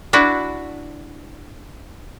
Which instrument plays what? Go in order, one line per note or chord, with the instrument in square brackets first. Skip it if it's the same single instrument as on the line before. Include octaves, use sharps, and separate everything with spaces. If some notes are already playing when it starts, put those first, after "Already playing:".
[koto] D4 E4 F#4